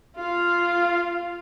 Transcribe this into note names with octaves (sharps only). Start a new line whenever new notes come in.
F4 F5